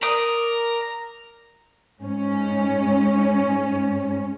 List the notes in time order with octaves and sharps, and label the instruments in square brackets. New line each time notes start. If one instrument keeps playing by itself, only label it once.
[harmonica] A#4 [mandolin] D5 D#6 [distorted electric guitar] A#5
[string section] G#2 C#4